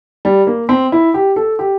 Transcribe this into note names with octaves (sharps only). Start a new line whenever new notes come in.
G3
A#3
C4
E4
G4
A4
G4